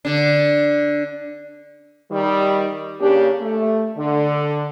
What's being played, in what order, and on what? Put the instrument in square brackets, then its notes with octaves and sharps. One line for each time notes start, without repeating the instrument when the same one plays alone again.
[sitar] D3 D4
[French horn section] D#3 G3
C#3 A#3 C#4 D4 G4
A3
D3